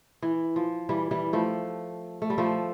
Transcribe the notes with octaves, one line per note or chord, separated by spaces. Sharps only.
E3
F3
E3 G3
E3 G3
F3 A3
A3
G3
F3 A3